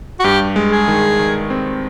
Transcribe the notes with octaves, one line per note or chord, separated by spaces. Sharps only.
F#4
G2 G4
G#3
G#4
D#3
D#3
C4